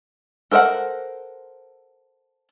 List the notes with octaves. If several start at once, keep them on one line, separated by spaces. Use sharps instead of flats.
A4 A#4 C5 E5 F#5